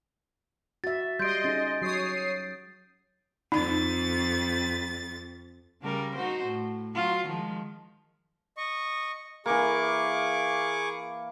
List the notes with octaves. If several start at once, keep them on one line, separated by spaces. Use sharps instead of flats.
F#4 E5 A6
G3 D#5 C6 G6 D7
C#4 D#4 G#4 A6
F#3 C#5 D#6 C7
F2 D#4 A6
C#3 G3 A#4
D#4 F#4 C5
A2
F#3 F4
D#3 F3 G#3
D#5 C#6
E3 A#3 G#4 C#6 D6